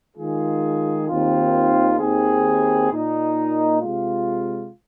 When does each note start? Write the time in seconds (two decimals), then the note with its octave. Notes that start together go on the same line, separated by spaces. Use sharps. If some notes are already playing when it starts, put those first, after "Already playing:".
0.16 D#3 G#3 F4 G#4
1.07 D#2 D#3 C4 F4
1.98 D#2 D#3 C4 G#4
2.89 A#2 A#3 D#4
3.80 C3 G#3 F4